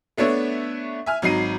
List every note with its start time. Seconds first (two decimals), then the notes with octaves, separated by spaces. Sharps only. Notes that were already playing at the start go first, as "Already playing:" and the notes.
0.17 A3 B3 D4 C#5 E5
1.06 E5 G#5 F6
1.22 G#1 F#3 D#4 C7 D#7